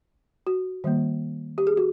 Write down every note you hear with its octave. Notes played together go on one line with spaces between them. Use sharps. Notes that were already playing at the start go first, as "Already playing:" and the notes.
F#4
D#3 G3 A#3
G4
G#4
F#4